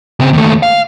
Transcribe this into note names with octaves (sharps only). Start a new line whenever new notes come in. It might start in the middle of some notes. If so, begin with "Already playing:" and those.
C#3 C4
D#2 A3
F5